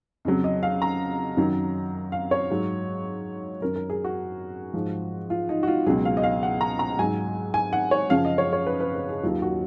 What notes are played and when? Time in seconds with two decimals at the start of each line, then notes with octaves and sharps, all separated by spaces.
0.25 F2 C#3 F#3
0.44 D#5
0.63 F5
0.82 A#5
1.37 F#2 D#3 F#3
2.12 F5
2.31 C#5
2.50 G#2 F#3
3.61 F#2 D#3 F#3 A#4
3.76 A#4
3.90 G#4
4.04 F#4
4.74 G#2 F3
5.30 F4
5.49 D#4
5.63 F#4
5.67 F4
5.86 C#2 B2 F#3 G#4
6.05 F5
6.17 D#5
6.23 F5
6.43 F#5
6.61 A#5
6.79 A#5
6.99 G#2 F#3 G#5
7.54 G#5
7.73 F#5
7.91 C#5
8.10 F#2 C#3 F3 F5
8.25 D#5
8.38 C#5
8.53 C#5
8.66 B4
8.80 B4
8.95 B4
9.09 G#4
9.23 D#2 D#3 F#3 F4
9.42 F#4